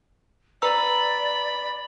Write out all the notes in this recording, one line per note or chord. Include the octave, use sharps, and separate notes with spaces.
B4 D5 A#5 B5 E6